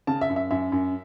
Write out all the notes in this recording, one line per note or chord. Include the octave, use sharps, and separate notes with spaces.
C#3 A5
E5
F#2
E5
F#2 E5
F#2